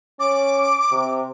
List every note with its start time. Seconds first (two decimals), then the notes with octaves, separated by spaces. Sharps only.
0.20 C#4 D6
0.92 C3